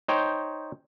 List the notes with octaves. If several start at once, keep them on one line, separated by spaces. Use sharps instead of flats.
D#4 C5 C#5 G5